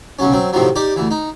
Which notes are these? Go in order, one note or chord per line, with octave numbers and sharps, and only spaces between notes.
B1 C#3 F#3 C#4
F#3 C4
A2 C3 D#3 F3 F#3
D#4 G4 D5
D2 E3
D#4